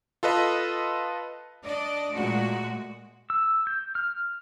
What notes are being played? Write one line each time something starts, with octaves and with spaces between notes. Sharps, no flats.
F4 A4 B4 D#5
D4 D5 D#5
A#2 G#3 A3 F#4
E6
G6
F6